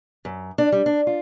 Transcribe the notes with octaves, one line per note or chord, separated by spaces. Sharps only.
F#2
D4
G3
D4
F4